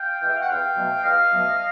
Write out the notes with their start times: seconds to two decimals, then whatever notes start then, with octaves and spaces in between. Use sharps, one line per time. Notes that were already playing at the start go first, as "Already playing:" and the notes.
Already playing: F5 G5
0.21 E3 G#3
0.27 E5
0.34 F5
0.41 F#5
0.48 E2 F5 G5
0.76 B2 F#3 A3
1.03 E2 D#5 F5
1.31 B2 F#3 A3